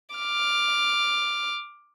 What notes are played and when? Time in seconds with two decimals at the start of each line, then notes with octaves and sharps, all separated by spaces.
0.16 D6 F6